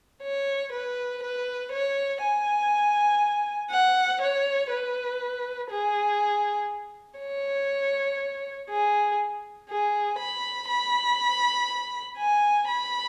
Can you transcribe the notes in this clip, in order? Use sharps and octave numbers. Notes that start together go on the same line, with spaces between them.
C#5
B4
B4
C#5
G#5
F#5
C#5
B4
G#4
C#5
G#4
G#4
B5
B5
G#5
B5